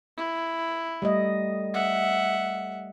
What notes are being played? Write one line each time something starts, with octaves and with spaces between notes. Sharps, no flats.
E4
G3 A3 D#5
E5 F#5